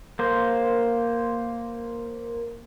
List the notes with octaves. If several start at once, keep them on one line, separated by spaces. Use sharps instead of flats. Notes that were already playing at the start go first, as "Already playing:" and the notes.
A#3 C5